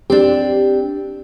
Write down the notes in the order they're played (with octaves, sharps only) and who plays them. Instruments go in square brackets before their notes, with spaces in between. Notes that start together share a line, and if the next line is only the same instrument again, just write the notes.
[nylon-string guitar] C4 D4 [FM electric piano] G4